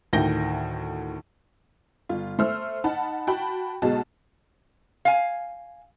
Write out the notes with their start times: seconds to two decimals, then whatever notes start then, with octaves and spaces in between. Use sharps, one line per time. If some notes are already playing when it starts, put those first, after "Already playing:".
0.13 D2 A2 D#3 G5 A#6 G7
2.09 G1 F4
2.39 A3 C5 E6 F6
2.84 D#4 F#5 A5 B5
3.27 F#4 G5 A5 B5
3.82 B1 B2 G#3 F#4 A5
5.05 F5 G#5